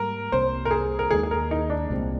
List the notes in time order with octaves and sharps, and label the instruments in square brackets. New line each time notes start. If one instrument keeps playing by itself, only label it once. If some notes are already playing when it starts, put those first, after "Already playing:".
Already playing: [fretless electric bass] G#2 G3 A#3 [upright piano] A#4
[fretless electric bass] C2 C3 G3 A#3 [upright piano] C5
[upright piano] A#4
G#4
A#4
[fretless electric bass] D#2 D#3 G#3 [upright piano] G#4
[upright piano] G#4
A#4
D#4
D4
[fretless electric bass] C2 A#2 G#3 C4